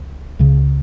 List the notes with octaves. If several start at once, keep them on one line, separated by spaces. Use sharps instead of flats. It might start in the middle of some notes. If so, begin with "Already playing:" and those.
Already playing: C#2
C#2 C#3